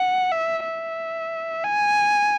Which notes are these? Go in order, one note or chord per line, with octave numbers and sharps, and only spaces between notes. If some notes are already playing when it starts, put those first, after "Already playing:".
Already playing: F#5
E5
E5
G#5